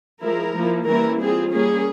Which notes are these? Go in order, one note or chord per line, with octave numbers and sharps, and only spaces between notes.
F3 G#3 E4 A#4
F3 A#3 E4
E3 G3 A#3 C#4 E4 A#4
G3 C4 F4 G#4
G3 A#3 C#4 G#4